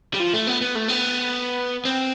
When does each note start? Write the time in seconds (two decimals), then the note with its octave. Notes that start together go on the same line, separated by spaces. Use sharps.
0.14 G3
0.20 F3
0.33 A3
0.47 B3
0.61 B3
0.75 A3
0.88 B3
1.85 C4